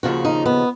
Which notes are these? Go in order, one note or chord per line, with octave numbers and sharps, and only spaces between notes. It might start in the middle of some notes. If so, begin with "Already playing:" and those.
D#2 C#3 F3 F#4
D#4
B3